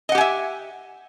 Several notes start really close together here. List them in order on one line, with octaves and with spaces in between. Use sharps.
D#5 F#5 G4 G#5 E5